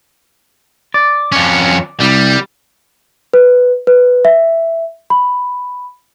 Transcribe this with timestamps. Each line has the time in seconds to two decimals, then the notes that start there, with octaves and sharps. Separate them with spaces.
0.94 D5
1.32 F2 C#4
2.00 C2 G3
3.34 B4
3.87 B4
4.25 E5
5.10 B5